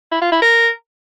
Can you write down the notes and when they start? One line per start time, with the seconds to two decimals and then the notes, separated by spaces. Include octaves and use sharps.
0.11 E4
0.22 F4
0.32 E4
0.42 A#4